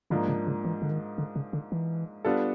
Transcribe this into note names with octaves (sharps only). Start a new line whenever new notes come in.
G#2 D3 F3 A#3 D4
C#3
C#3
E3
D3
D#3
D3
C#3
D3
E3
G3 B3 D4 F4 A4